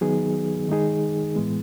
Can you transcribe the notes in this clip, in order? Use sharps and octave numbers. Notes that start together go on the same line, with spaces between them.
D#3 F#3 B3 D#4 G#4
D#3 G#3 D#4 G#4
A2 E3 G#3 B3